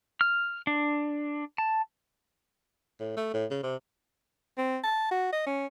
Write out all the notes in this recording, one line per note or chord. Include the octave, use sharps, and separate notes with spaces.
F6
D4
A5
A2
A3
A2
C#3
C3
C4
A5
F#4
D#5
C#4